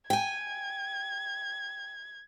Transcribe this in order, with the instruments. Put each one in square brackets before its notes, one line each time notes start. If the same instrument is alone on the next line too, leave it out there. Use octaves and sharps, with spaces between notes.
[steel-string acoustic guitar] G5 G#5 [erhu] G#6